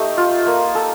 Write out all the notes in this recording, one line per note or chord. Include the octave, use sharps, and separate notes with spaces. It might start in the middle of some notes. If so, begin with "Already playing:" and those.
Already playing: A3 D#4 G4
F4
A#3
A4